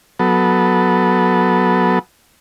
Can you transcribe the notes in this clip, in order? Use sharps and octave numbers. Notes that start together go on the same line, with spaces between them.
F#3 B3 A4